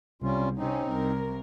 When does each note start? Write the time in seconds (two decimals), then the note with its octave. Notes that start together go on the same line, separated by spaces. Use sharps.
0.22 C2 G3 C#4 F4
0.57 C3 C4 C#4 D#4
0.91 C2 A#4